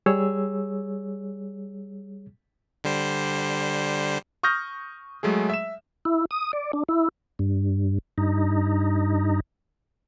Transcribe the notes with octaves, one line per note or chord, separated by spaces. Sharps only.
G3 G#4 C#5 E6
D3 G3 C5
C#6 D#6 F6 G6 A#6
F#3 G#3 A3 G#4
E5 E7
E4
D#6
D5
D4
E4
G2
G2 D#4